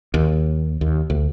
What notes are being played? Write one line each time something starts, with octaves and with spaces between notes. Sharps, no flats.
D#2
D#2
D2